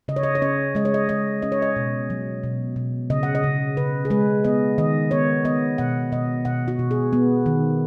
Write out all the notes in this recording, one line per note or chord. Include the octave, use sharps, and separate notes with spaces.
C#3 D#5
C#5
D#5
C#5
C#4 D#5
G#3 D#5
C#5
D#5
G#3 D#5
C#4 D#5
C#5
D#5
B2
F#3
B2
B2
C#3 D#5
F#5
D#5
C#3
C#3 B4
G#4
G#3 B4
B3 D#5
D#3 D#5
B3 C#5
B3 D#5
B2 F#5
B2 D#5
B2 F#5
F#4
B2
G#4
B3
D#3